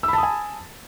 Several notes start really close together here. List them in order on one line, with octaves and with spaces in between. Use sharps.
E6 B5 A5 D#6 G#5